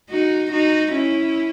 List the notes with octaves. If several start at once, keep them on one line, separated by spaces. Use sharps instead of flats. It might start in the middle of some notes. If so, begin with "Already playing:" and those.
D#4 F#4
D#4 F#4
C#4 E4